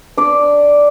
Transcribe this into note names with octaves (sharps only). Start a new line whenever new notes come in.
D4 D5